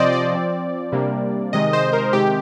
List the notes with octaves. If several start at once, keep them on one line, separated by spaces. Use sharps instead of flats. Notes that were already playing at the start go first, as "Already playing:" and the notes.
Already playing: C3 F3 C4 C5 D5 D#5
D5
F3 C4
C3 G3 A#3 D4
C3 D#3 G#3 D#5
C5
A#4
C3 D#3 G#3 C4 G4